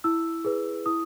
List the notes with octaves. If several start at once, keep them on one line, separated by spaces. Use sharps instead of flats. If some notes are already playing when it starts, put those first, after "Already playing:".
E4 E6
G#4 B4
E4 D#6